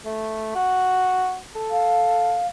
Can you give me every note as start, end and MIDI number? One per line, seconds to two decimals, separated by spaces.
0.05 0.53 57
0.55 1.36 66
1.55 2.40 69
1.70 2.46 77